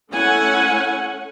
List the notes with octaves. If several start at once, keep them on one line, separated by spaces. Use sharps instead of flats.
A3 C#4 E4 F#5 G#5